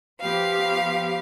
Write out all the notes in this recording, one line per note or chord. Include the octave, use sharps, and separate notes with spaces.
F3 B3 G4 F5